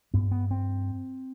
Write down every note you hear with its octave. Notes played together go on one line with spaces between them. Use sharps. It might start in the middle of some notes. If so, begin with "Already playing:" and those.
G2 B3
B3
C4